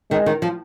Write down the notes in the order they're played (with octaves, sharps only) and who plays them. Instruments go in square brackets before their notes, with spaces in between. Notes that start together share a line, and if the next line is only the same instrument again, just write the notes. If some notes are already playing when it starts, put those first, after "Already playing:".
[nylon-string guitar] D#3 [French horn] G#3
[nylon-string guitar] D#3
F3